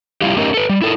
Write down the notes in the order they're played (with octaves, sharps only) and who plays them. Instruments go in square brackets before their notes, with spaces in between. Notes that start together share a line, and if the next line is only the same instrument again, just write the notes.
[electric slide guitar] G3 E4 F4 G4
A3 C#4 D#4 G4 A#4
A4 B4
G3
E4 A4 A#4